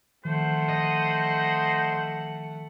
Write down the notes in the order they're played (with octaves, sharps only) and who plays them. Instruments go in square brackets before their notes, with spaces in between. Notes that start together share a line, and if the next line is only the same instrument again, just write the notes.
[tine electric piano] D#3 F3 [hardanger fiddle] A3 F#5 [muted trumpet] C5
[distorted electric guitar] D#5